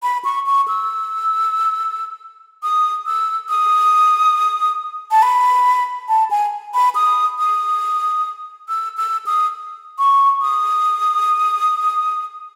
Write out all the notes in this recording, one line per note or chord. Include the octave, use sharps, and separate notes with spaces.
B5
C#6
C#6
E6
D#6
E6
D#6
A5
B5
A5
G#5
B5
D#6
D#6
E6
E6
D#6
C#6
D#6